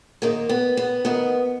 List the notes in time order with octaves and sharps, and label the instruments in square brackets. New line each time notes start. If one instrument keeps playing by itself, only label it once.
[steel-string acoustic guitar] G#2 D#3 A#3
B3
B3
G#2 D#3 B3